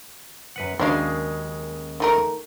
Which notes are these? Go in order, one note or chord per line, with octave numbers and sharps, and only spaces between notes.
F#2 B4 F#5
D#2 C#3 F#3 G#3 D4 F5
D#3 A3 A#4